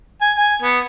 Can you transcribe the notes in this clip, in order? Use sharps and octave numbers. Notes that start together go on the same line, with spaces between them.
G#5
G#5
B3